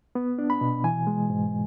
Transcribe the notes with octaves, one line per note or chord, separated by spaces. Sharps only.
B3
D4
B5
B2
E3 G#5
G#3
G#2